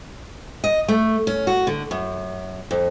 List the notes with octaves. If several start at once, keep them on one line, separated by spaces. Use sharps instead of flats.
D#5
A3
C#4
F#4
D3
F#2
F2